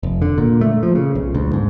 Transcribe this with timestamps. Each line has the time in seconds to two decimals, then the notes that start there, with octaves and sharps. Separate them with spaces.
0.03 F1
0.22 D3
0.38 A#2
0.61 A3
0.83 F3
0.95 C#3
1.15 B1
1.35 D2
1.53 G#2